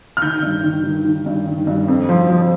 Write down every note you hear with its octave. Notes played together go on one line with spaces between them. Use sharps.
F6
D#3 G6
G2
D#3
D#3
D#3
G2
D#3
G2
F2
F3
F3